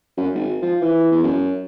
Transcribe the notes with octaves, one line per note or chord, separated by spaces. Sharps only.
F#2
G#1
F3
E3
E2
F#2